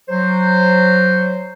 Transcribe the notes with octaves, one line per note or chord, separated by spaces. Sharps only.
F#3 C5